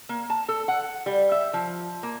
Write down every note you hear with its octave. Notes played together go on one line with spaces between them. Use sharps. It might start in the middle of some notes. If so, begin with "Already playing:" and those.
A#3
A5
A4
F#5
G3
E5
F3
A#3